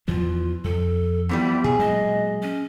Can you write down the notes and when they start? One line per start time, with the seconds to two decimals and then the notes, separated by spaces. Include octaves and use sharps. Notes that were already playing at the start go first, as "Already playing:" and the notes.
0.08 E2 E3 F3 F4
0.64 F2 A4
1.29 F2 E3 G3 B3
1.64 B2 G#4
1.79 A#2 F#3 G#3 D#5
2.43 C#4